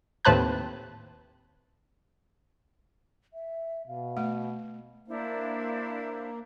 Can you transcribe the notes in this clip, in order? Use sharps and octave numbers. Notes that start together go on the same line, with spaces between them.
D#2 A2 C4 B4 A5 F#6
E5
B2 F5
A3 F#5
A#3 D4 E4 C5